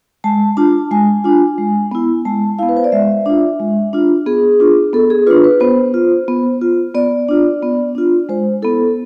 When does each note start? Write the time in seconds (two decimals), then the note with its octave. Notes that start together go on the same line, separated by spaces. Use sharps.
0.24 G#3 A5
0.57 D4 F4 A5
0.91 G#3 G#5
1.24 D4 F4
1.58 G#3
1.91 B3 E4
2.25 G#3 A5
2.59 B3 E4 F5
2.69 B4
2.77 C5
2.84 D5
2.92 G#3 E5
3.26 D4 F4
3.60 G#3
3.93 D4 F4
4.26 B3 G#4
4.60 D4 F4
4.93 B3 A4
5.10 G#4
5.27 D4 F4 B4
5.44 B4
5.60 B3 C5
5.94 F4
6.28 B3
6.61 F4
6.95 B3 D5
7.28 D4 F4
7.62 B3
7.95 D4 F4
8.29 G#3 C5
8.62 B3 E4 A4